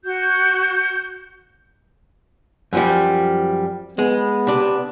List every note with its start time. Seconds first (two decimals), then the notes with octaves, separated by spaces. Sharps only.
0.04 F#4 G6
2.73 F#2 F3 G3
3.99 G#3 B3
4.47 C3 D4